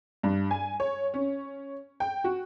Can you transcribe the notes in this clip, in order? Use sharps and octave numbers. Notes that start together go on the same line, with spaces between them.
G2
G#5
C#5
C#4
G5
F#4